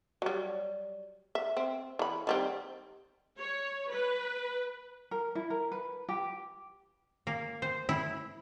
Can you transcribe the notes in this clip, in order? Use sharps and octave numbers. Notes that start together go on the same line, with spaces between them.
F#3 G3
E5
C4
E3 B5
D#3 G3 C4
C#5
B4
A#4
E4
A#4
B4
G4
A#3
C5
E4